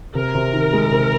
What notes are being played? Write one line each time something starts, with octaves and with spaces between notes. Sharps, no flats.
C3 A#4
C3
D#3
G#3
C3